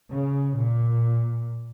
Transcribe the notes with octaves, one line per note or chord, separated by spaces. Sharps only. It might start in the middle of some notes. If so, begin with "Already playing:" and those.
C#3
A#2